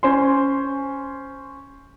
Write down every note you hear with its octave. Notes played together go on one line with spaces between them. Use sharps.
C#4 C5 G#5 C6